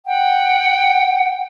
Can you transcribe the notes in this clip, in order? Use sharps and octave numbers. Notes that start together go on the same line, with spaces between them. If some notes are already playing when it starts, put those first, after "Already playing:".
F#5 G5